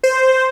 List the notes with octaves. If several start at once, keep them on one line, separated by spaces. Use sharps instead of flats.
C5